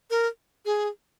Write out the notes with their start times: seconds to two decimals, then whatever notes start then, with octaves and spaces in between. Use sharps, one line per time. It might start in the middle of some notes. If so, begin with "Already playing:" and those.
0.11 A#4
0.66 G#4